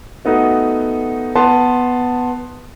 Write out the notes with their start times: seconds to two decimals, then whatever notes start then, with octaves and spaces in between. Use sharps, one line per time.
0.25 A3 B3 D#4 F#4
1.35 B3 A5 C6